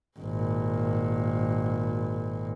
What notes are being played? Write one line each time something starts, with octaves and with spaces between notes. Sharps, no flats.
G#1 A#2